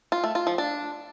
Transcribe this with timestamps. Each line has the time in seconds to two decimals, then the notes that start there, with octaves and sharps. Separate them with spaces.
0.12 F4
0.24 A3
0.35 F4
0.47 F3
0.58 D4